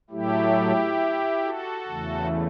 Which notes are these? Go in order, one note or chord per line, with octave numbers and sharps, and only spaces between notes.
A2 F#3 A3 E4 G4
F#4 A4
E2 C#3 E3 A3